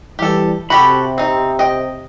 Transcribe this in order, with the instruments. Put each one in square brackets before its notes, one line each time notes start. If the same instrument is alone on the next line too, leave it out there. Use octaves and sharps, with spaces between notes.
[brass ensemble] E3 G3 [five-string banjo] G4 A4
[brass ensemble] C3 [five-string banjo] F#4 G4 A4 [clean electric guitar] B5
[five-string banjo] C4 D#4
D#5 G5